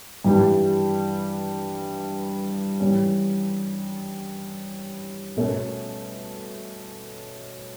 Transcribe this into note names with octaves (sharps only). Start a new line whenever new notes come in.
G2 E3 G3
E3 G3 C#4
B2 A3 C#4